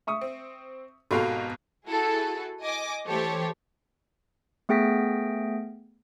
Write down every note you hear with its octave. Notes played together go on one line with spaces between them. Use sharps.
E5 C#6 D#6
C4
G#1 B2 F#4 G4 A4 F5 B5 C6
E4 F#4 G#4 A4
D#5 G#5 D6
E3 A3 G4 A4 C5 C#5
A3 B3 G#4 G5 A#6 B6